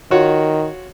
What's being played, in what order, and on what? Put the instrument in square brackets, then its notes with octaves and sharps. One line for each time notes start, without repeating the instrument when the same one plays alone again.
[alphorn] D#3 [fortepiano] F4 F#4 C#5